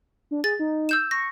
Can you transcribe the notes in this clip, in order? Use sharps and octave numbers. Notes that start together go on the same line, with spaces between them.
D4
G#4 A6
D#4
E6 G6 E7
C#6 A#6